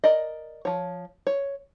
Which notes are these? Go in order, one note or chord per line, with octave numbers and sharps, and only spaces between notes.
A#4 D5 D#5
F3 C#5
C#5